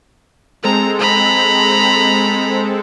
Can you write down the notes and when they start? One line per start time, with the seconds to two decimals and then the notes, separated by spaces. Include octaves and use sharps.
0.64 G#3 C4 A4 A#5
1.00 A#5 B5